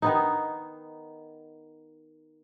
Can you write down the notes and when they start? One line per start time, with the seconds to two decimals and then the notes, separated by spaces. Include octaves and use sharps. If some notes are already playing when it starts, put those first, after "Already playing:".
0.02 D#3 B3 D#4